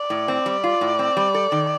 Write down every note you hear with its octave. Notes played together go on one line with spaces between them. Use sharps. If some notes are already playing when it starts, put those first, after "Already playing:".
Already playing: D5
A2
C4
G3
F4
A2
C4
G3
A4
D#3